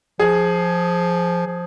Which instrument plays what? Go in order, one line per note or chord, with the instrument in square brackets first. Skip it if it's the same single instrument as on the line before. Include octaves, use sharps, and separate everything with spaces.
[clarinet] F3 [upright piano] G#4
[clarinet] F3